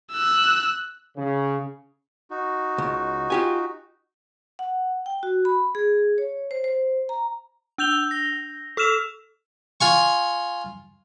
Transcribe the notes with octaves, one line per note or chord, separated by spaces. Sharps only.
E6 F#6
C#3
D#4 F#4
C#2
F4 G4 G#5
F#5
G5
F#4
B5
G#4
C#5
C5
C5
A#5
D4 E6 G6 F7 G7
A#6
A4 E6 F6 E7 F7
F4 G#5 C#6